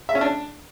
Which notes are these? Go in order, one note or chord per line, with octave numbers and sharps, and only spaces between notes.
E5
C#4
D4